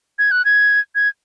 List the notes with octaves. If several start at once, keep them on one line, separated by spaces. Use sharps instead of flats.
G#6
F#6
G#6
G#6